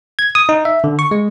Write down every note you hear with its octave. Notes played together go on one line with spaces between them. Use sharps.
G#6
D#6
D#4
E5
D3
C#6
G#3